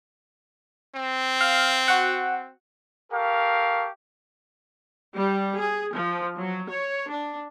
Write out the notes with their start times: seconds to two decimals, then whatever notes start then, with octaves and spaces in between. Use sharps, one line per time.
0.96 C4
1.41 F5
1.88 F#4 F#5
3.12 G4 A4 A#4 F5 C#6
5.17 G3
5.58 G#4
5.93 F3
6.38 F#3
6.69 C#5
7.10 D4